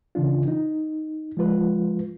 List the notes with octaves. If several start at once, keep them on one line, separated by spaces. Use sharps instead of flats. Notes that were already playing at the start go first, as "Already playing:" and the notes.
C#3 E3 D4 F4
D#4
F3 G#3 F4 B4